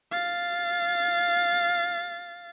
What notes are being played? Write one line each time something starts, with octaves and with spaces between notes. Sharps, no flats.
F5 A6